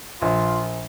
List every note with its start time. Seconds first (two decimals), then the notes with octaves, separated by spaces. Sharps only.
0.22 A#1 F4